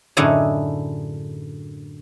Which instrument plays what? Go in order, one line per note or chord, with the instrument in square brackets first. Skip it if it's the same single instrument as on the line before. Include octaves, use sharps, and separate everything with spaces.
[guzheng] F#2 A2 D3 D#4 E4 G#4